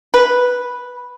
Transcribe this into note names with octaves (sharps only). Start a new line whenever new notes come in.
B4